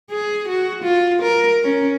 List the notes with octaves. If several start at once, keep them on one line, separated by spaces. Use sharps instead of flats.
G#4
F#4
F4
A#4
C#4